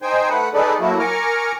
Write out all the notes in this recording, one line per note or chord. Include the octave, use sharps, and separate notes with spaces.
D#4 C5 G5 G#5
A3 B4 F#5
D#4 G#4 A4 B4 D5
F#3 A3 A#3 E4 F#4
A#4 G#5 A#5 C#6 D6 F6